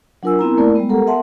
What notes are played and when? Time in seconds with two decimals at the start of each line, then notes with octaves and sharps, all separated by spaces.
0.23 F#3 D4 F4 A#4 G#5 E6
0.39 B3 C4 E4 A#4 A#5
0.57 A3 A#3 E4 A#4 D5
0.75 G3 G#3 B3
0.89 G4 A4 A#4 F#5 A#5
1.07 B3 A#4 E5 F#5 A5 C6